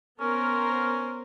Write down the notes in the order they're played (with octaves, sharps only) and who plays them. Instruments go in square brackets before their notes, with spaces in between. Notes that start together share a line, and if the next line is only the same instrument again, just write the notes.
[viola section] B3 A#4 C5 [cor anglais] C#4